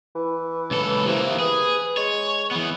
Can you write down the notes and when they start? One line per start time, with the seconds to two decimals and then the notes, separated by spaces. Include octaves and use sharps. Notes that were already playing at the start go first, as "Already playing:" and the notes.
0.15 E3
0.71 C#2 A4
1.06 C3 E3 A#3
1.39 G#4 B4
1.97 G#3 C#5
2.51 E3 B3